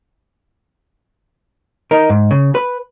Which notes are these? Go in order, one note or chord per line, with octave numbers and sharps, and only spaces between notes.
D#4 A#4
G#2
C#3
B4